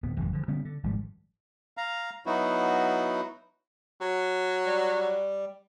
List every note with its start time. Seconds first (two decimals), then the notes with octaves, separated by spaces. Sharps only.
0.03 D1 B3
0.17 G#1 F#2 C3 E3
0.33 D3 F3
0.48 D3 G3 B3 C#4
0.65 D3
0.83 G#1 G#2 F3 G3
1.77 F5 A#5
2.26 F#3 B3 D#4 E4 F#4
4.01 F#3
4.66 G3